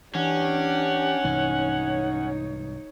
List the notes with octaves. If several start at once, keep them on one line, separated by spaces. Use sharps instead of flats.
E3 C#4 D4 G4 F#5
C2 G#2 E3 D#4 C#5